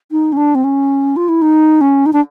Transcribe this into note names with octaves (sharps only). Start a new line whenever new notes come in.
D#4
C#4
D4
C4
C#4
F4
E4
D#4
C#4
D#4
D4